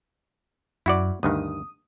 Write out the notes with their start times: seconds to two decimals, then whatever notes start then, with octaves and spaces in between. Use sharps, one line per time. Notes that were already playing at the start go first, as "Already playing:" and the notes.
0.86 F#2 E4 F#4 D5
1.23 D2 G2 D#3 D#6